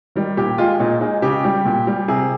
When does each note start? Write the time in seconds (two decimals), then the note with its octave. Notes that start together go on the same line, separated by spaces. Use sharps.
0.16 D#3 G3
0.37 A#2 G4
0.58 G#3 F4
0.80 A#2 D#4
1.01 G#3 D#4
1.22 C#3 G4
1.44 G3
1.65 A#2
1.87 G3
2.08 C3 G#4